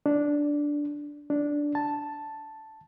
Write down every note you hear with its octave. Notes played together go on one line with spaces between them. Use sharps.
D4
D4
A5